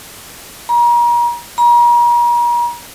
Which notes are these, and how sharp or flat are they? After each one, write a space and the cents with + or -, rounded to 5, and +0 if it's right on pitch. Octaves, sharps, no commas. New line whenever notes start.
A#5 +35
A#5 +40